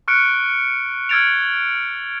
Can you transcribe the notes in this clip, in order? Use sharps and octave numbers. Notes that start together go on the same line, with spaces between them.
C#6 F6 F#6 C#7 D7
E6 F6 G#6 A6 D7 F7